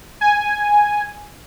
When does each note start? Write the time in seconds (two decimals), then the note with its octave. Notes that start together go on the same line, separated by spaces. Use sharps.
0.21 G#5